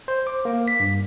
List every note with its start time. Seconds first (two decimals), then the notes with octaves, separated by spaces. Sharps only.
0.08 C5
0.27 D6
0.45 A#3
0.68 B6
0.80 G2